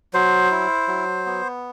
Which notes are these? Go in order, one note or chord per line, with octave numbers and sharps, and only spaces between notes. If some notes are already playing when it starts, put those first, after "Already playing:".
F#3 C5
E4
F#3
B3